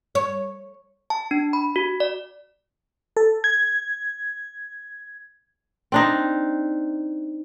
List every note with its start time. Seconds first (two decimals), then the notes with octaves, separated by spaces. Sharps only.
0.15 C#5
1.10 A5
1.31 D4
1.53 B5
1.76 F#4
2.00 D5
3.17 A4
3.44 G#6
5.92 C4 D4 D#4